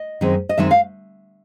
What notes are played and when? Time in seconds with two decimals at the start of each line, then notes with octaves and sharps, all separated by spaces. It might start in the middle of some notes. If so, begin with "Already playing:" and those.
Already playing: D#5
0.21 F#2 D#3 G#3 C4 D#4
0.49 D#5
0.58 F#2 D#3 G#3 C4 D#4 E5
0.71 F5